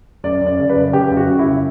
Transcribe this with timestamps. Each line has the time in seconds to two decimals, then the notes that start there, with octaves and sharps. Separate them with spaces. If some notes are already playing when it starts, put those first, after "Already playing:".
0.24 F#2 D5
0.41 F#2
0.47 D5
0.59 C#3
0.69 B4
0.76 F#2
0.93 C#3 G4
1.11 F#2
1.17 F#4
1.28 C#3
1.39 E4
1.46 F#2